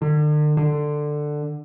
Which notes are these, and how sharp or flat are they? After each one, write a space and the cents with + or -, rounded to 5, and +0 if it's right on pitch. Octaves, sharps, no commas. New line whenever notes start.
D3 +40
D3 +15